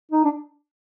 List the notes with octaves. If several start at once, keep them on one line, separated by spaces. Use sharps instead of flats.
D#4
D4